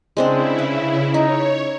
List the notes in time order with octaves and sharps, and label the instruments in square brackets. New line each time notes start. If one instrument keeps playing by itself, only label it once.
[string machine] C#3 E4 [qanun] G#3 C4 D4
[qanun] B4
[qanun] D#4 [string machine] C#5